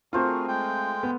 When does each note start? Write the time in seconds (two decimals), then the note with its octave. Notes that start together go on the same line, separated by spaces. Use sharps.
0.13 A3 C4 F4 F#4 G#4 A#4 C5 F5
0.48 G#3 G5
1.03 B3